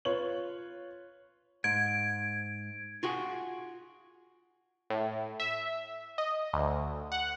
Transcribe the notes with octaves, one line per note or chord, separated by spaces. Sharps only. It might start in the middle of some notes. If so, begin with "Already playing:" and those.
F4 B4 C#5 F#7
G#2 G#6 D7
F4 F#4 G#4
A2
E5
D#5
D2
F#5